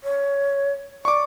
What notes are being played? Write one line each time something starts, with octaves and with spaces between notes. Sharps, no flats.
C#5
D5 C#6 D6